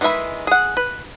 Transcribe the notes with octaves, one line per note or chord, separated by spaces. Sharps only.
D#3 E3 G#3 E5 B5
G#4 F#5
B4